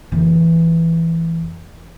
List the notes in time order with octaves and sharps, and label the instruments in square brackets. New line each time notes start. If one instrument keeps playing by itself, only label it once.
[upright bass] F1 E3